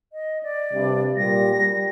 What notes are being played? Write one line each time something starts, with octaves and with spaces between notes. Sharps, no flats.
D#5
D5
G2 C3
A#2 G3 A#6
G3